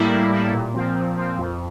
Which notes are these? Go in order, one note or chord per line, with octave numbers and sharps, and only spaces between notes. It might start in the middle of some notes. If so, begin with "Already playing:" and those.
Already playing: A2 G3 A#3 E4
A2
G3 A#3 E4
A#2
F3 C4
A#2
F3 C4
F2